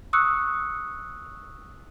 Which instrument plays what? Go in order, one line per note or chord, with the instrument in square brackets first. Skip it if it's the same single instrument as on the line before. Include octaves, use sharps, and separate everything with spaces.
[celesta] C#6 D#6 E6 F#6 C#7